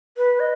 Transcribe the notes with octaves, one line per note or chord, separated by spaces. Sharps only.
B4
D#5